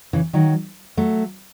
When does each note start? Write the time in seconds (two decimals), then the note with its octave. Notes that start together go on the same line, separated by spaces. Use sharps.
0.13 C#3 E3
0.33 D#3 F#3
0.97 F#3 A3